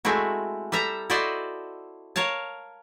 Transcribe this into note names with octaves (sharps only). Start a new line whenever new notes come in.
G#3 A3 C4 E4 F#4
G3 A4 E5 A#5
E4 F#4 A4 C5 D5 D#5
A#4 C#5 F5 A5